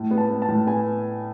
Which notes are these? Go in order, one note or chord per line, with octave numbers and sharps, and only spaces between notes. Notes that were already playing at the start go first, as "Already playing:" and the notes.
Already playing: A2
B3
A5
B3
A5
A2
B3 G#5